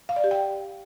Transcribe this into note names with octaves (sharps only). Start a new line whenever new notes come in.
F5
D5
G4
G5